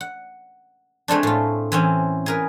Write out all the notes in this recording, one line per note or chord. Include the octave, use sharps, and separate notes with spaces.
F#5
G#3 A3 C4 D4
A2 F4
E3 C4 C#4
G#4 A#4 B4